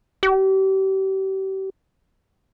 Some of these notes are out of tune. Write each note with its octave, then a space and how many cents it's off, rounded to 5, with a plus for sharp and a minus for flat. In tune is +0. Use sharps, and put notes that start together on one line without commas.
G4 -35